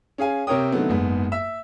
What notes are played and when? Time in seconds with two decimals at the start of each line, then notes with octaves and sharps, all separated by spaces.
0.18 C#4 G#4 F5 G#5
0.47 C3 C4 A#4 C#5 G5 D#6
0.72 D3 D#3 F#3 A3 B3 C4
0.89 F#1 G#2 B3
1.32 E5 E6